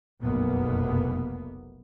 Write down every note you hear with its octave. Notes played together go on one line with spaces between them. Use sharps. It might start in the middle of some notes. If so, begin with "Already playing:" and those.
F1 B1 F#2 B2 A#3 B3